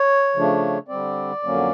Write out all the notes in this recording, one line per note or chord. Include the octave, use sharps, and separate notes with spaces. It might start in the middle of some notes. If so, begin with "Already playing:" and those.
Already playing: C#5
C#3 F3 A3 D4
D3 G3 C4 D5
F2 D3 F#3 A#3 C#4